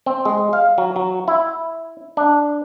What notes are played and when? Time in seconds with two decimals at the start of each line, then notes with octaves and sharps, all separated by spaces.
0.06 C4
0.25 G#3
0.53 F5
0.78 F#3
0.96 F#3
1.28 E4
2.17 D4